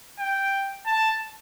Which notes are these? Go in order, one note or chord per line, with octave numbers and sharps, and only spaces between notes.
G5
A5